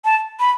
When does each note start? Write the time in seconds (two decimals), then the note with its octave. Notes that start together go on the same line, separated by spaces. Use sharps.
0.05 A5
0.40 B5